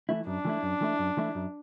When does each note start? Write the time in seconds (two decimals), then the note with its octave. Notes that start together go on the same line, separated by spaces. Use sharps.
0.09 E3 A3 E4
0.27 F#2 D4
0.45 E3 A3 E4
0.63 F#2
0.81 E3 A3 E4
0.99 F#2
1.17 E3 A3 E4
1.35 F#2